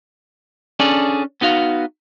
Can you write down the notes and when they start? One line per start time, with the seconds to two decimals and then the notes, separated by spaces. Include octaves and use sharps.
0.80 C#4 D4 G#4 A4 D5
1.41 B3 D#4 F#4 F5